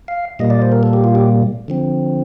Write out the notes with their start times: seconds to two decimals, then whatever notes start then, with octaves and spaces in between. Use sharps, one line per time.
0.08 F5
0.39 A#2 G3 A#3 D#5
0.50 D5
0.62 C5
0.72 A#4
0.83 A4
0.93 G4
1.04 F4
1.15 G4
1.68 D3 F3 C4